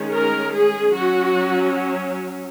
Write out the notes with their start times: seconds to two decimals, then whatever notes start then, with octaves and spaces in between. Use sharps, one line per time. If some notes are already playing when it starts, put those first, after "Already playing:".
Already playing: D#3 G#3 C#4
0.11 A#4
0.52 G#4
0.94 F#3 C#4 F#4